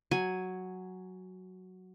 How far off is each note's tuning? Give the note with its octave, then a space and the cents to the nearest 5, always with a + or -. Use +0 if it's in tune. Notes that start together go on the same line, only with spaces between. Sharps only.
F#3 +0 G#5 +0